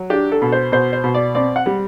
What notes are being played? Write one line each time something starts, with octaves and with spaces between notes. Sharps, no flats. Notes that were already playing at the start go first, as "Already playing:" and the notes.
Already playing: F#3
D4 G4
A4
B2
C5
B2 C5
C5
B2
D5
C4 D5
F#5
G3